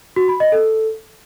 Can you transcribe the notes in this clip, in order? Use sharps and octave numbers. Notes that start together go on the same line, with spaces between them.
F#4
B5
D#5
A4